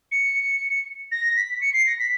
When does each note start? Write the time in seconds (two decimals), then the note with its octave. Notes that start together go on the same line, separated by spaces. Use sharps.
0.12 C#7
1.12 A#6
1.37 B6
1.61 C#7
1.74 C7
1.87 A#6
1.99 B6